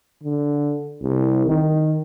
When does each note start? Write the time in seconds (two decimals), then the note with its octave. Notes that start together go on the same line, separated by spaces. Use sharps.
0.23 D3
1.02 C2
1.46 D#3